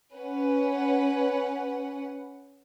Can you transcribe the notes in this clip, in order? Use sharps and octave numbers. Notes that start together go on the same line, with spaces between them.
C#4 B4 F#5